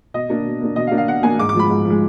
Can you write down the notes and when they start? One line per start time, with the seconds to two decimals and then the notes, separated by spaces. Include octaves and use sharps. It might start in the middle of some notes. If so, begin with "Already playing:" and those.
0.14 B2 D#5
0.29 A#3 D4
0.45 B2
0.61 A#3 D4
0.76 B2 D#5
0.87 F5
0.92 A#3 D4
0.98 F5
1.08 B2 F#5
1.23 A#3 D4 G#5
1.39 G#2 D6
1.49 D6
1.55 F3 G#3 B5
1.70 G#2
1.85 F3
1.90 G#3